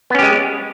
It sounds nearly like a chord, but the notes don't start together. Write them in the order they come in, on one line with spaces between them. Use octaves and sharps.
B3 C#4 G4 G#3